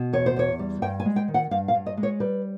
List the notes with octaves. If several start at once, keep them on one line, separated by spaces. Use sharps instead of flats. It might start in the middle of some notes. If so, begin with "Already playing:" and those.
Already playing: B2
E2 C#5
C5
E2 C#5
G3
G2 G5
G#5
G#3
G5
D#3
F#5
G2 F5
F5
G2
D#5
G#3
C#5
G3 B4